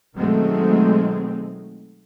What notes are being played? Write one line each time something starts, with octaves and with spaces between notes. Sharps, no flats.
B2 D#3 F#3 G#3 A3 C4